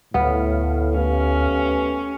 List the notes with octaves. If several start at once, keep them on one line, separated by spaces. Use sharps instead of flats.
D2 A2 B3 F5
A3 C#4 G4 B4